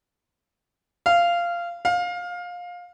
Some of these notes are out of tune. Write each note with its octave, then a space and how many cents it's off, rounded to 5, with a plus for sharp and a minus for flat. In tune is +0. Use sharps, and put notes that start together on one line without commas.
F5 -15
F5 +20